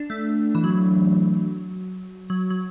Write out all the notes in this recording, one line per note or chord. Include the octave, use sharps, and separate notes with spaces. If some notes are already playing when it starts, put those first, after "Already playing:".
Already playing: D4
A3
E3
F#3
F#3
F#3